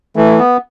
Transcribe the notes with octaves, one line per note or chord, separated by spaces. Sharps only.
E3 A3
B3